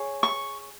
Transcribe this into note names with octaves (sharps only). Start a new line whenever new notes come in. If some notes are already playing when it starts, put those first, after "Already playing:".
Already playing: G#4 C#5
C#6